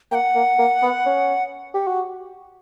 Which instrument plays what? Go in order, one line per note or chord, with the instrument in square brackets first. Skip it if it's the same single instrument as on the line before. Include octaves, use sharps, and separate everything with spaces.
[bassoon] A#3 [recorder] G5
[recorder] F#5
[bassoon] A#3
A#3
B3
C#4
G4
F#4